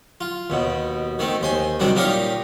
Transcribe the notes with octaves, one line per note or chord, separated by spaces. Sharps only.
F4
D#2 B2
D#3 A3 C4
D#2 C5 G#5
C3 D#3 F#3 G3 D4
A#2 D#4 G4 A#4 C#5 F5